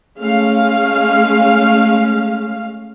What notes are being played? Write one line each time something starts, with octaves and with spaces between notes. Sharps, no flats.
G#3 A3 C#4 F5